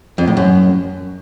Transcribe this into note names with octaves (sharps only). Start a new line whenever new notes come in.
F2
A2
F#2